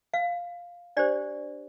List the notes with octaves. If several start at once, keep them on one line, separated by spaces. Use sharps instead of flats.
F5
D4 G4 C5 D5